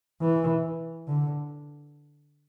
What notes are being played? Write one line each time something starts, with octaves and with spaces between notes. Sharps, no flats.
E3
D3